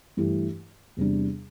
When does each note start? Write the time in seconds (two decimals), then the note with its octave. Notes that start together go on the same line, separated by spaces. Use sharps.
0.17 G2 E3 A3 E4 G4
0.97 E2 C3 G3 D4